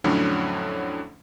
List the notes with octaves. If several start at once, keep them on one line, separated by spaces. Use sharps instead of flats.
F2 A2 D3 F#3 C#4 D4